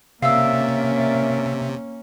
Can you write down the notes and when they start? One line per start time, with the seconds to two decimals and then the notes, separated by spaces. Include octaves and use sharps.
0.22 C3 A#3 C#4 A#4 D5 E5 F5 E6